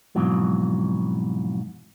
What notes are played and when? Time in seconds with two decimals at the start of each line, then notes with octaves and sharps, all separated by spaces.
0.15 F2 G#2 B2 E3 F#3